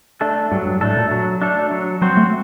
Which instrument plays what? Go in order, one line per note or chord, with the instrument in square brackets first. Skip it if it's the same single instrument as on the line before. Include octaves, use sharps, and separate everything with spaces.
[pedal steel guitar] A3 D4 A4
[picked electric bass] G2 [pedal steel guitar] F#3
[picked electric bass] G2
[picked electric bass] A2 [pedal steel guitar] A3 D4 A4
[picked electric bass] A#2
[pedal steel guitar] F#3
A3 D4 A4
F#3
[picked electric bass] F#3 [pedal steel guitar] C4 F#4 C5
[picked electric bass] A3